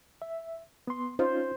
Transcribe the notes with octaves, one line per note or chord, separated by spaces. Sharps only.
E5
B3 C6
C#4 D#4 F4 C5